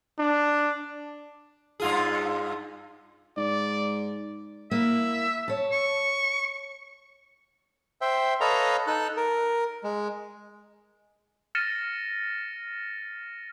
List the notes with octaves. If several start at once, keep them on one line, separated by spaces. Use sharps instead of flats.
D4
G2 F4 G#4
G#2 D5
A#3 E4 E5
C#5 A5
C#6
C5 E5 G5
A4 B4 C#5 D#5 F5 A#5
D#4 A4 F#6
A#4
G#3
F6 A6 A#6 C#7 D#7 E7